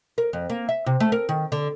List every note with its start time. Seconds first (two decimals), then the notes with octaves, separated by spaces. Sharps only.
0.18 A#4
0.33 F2
0.50 A#3
0.69 E5
0.86 C3
1.00 A3
1.12 A#4
1.29 D#3
1.52 D3